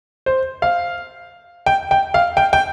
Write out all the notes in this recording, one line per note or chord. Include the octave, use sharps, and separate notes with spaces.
C5
F5
G5
G5
F5
G5
G5